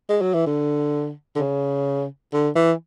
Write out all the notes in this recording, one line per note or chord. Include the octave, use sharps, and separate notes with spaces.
G#3
F#3
E3
D3
D3
C#3
D3
E3